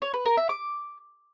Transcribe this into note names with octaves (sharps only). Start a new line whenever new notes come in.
C#5
B4
A#4
E5
D6